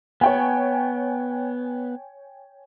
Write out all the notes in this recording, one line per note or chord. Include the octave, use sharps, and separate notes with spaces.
B3 C#5 G5 G#5